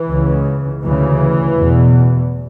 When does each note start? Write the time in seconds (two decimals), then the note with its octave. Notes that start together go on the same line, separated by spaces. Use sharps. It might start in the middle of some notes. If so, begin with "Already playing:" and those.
Already playing: E3
0.09 C#2 C#3
0.83 D2 C#3 E3
1.57 E2 B2